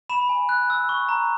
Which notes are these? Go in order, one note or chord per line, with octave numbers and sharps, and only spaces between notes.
B5 E7
G#5
F#6
E6
C#6
A#5